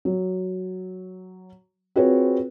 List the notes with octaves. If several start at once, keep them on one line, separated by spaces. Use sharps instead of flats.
F#3
C4 F4 F#4 G#4 B4 C#5